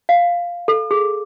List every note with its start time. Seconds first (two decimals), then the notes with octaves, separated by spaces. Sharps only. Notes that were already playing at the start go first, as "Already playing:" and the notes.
0.09 F5
0.68 A4
0.91 G#4